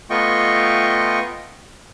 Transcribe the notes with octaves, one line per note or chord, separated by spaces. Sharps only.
A3 B3 F4 D#5 G5 C#6